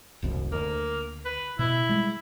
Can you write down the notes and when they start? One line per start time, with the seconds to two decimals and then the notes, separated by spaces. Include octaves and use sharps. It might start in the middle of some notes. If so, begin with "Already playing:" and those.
0.22 D#1 C2 F#2
0.52 D2 A#3
1.25 B4
1.59 B2 E4
1.89 G3 G#3